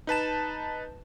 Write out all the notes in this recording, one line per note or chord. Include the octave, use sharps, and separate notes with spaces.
D#4 B4 A5 E7